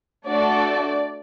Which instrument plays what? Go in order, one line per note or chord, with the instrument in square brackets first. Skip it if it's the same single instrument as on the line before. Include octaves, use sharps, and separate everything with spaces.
[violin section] A3 D4 F#4 A4 D5